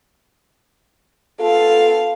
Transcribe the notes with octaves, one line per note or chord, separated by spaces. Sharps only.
B3 F4 A4 F5